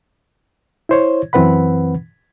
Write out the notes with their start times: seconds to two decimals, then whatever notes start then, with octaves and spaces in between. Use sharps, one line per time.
0.89 E4 C5 C#5
1.33 F#2 E3 C4 B4 F#5 B5